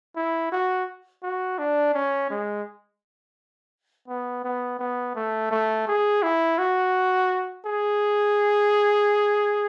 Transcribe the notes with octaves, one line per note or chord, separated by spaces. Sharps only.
E4
F#4
F#4
D4
C#4
G#3
B3
B3
B3
A3
A3
G#4
E4
F#4
G#4